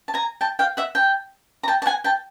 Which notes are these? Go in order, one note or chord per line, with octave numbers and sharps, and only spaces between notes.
A5
G#5 A#5
G5 A5
F5 G5
E5 F#5
G5 A5
A#5
G5 A5
A5
F#5 G#5
G5 A5